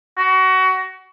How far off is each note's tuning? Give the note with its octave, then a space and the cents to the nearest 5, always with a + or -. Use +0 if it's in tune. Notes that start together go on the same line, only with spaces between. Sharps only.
F#4 +25